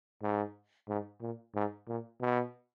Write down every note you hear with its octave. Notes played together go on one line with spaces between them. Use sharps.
G#2
G#2
A#2
G#2
A#2
B2